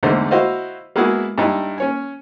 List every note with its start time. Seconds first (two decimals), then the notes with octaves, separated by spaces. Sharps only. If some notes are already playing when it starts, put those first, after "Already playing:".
0.03 E2 G#2 D3 A3 D#4 C5
0.31 E4 F#4 C5 D#5 F5
0.96 G#3 A#3 B3 E4 F#4 G#4
1.38 G2 D#4 E4
1.78 C#4 C#5 G#5